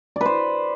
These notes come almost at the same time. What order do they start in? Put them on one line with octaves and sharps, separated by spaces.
D5 B4 C5